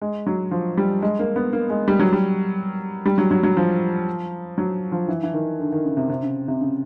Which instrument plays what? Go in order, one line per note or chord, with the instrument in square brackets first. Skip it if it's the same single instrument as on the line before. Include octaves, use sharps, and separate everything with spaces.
[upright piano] G#3
F#3
F3
G3
G#3
A#3
B3
A#3
G#3
G3
F#3
G3
G3
F#3
F#3
F#3
F3
F#3
F3
E3
E3
D#3
D3
D#3
C#3
C3
C3
C#3
C3
C#3